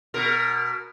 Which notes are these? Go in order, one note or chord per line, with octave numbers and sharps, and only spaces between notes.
B2 A#4